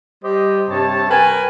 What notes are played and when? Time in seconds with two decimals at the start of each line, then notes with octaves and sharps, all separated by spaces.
0.24 G3 G4 C5 D#5
0.69 G2 C3 C4 C#5 A5
1.10 A#4 B4 G5 G#5